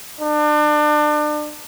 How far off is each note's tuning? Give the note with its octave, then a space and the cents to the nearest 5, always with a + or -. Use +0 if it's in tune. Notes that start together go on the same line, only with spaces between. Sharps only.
D4 +35